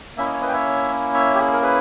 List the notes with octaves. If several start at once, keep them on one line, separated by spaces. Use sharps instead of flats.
A#3 C#4 E4 E5
D#5
C#5
B4 D#5
G5
C#5 E5
C#5 E5
G4
G#4
A#4
G#4 B4